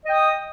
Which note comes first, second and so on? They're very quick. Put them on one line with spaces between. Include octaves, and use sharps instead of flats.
D#5 G5 D#6